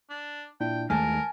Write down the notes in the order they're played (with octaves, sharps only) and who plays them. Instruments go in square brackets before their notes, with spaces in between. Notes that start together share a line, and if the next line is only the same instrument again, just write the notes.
[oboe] D4
[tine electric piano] A#2 D4 E4 [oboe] G5
[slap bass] D#2 G#3 A3 [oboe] A#4 [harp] G#5 [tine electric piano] A5 F6